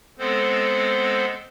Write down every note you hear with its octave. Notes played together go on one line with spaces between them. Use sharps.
G#3 B3 C4 A4 C5